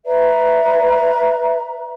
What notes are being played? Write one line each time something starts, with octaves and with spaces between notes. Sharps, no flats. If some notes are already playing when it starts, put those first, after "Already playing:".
B4 D5 E5 A#5